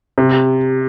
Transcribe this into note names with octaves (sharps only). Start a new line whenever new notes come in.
C3